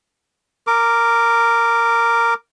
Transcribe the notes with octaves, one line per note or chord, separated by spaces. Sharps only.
A#4 D6